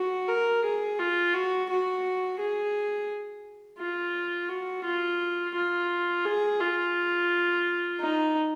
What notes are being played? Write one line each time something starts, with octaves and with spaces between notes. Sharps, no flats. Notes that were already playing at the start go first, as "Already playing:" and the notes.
Already playing: F#4
A#4
G#4
F4
F#4
F#4
G#4
F4
F#4
F4
F4
G#4
F4
D#4